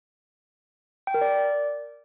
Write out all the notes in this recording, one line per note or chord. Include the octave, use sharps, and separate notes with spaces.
G5
A#4
D5